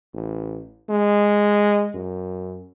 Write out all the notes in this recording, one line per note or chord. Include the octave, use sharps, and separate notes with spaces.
A1
G#3
F#2